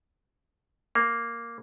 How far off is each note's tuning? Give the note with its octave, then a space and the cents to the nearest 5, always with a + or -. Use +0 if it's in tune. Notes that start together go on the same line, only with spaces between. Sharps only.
A#3 +0